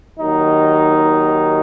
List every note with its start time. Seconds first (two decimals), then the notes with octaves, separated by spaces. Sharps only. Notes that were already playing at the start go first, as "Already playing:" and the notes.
0.19 D#2 D#3 F#3 D#4